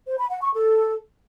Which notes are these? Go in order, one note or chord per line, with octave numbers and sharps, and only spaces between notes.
C5
B5
F#5
C#6
A4